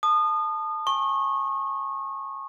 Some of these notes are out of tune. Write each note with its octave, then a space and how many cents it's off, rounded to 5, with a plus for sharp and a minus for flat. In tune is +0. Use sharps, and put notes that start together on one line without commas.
A5 +0 D#6 -30
G#5 +0 C#6 -25